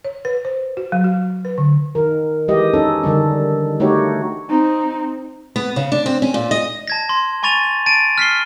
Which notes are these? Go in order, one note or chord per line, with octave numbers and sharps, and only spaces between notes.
C#5
B4
C5
F#4
F#3
F#4
B4
D3
D#3 A#4
E3 G#3 G4 D#5
C#4 D#4 A4
D3 D#3 G3 D4
A3 D#4 F#4 G4 C#5
C4 D#4
B3
C#3
D4
C4
C#4
A#2
D#5
A5 G#6 A#6
C6
G#5 B5 C#6 A6 D#7 F7
A5 A6 D7 D#7
F6 B6 C7 G7